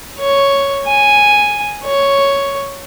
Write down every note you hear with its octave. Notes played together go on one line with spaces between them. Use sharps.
C#5
G#5
C#5